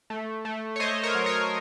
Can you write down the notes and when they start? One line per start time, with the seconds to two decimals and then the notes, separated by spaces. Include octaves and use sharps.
0.10 A3
0.45 A3
0.76 C#5
0.80 A3 C5 D#5
1.03 A#4 C#5
1.15 F#3
1.26 A#4 C#5